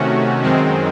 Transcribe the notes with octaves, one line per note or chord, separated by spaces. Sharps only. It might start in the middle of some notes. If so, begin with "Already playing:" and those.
Already playing: C3 D#3 A3 C#4 F#4
F#2 D#3 G#3 C4